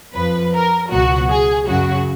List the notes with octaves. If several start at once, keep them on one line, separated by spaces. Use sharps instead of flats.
F2 F3 B4
A#4
C#2 B2 F#3 F#4
G#4
F#2 C#3 F#3 F#4